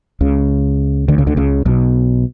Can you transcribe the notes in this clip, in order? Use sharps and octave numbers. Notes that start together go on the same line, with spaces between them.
C#2 C#3
D2 D3
C#2 C#3
D2 D3
C#2 C#3
B1 B2